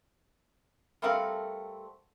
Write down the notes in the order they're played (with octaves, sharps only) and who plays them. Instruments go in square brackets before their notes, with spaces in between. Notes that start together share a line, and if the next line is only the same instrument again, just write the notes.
[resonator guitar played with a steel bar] G3 A3 C4 A#4 F5 F#5